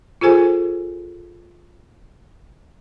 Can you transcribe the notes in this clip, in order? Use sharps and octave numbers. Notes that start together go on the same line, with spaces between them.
F4 G#4 A4 C5 G#5